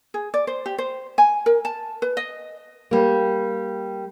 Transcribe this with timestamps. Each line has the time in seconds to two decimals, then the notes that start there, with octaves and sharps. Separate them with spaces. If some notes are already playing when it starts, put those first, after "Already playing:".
0.14 G#4
0.34 D5
0.47 C5
0.66 G4
0.78 C5
1.18 G#5
1.46 A#4
1.65 A5
2.02 B4
2.17 D#5
2.91 G3 A#3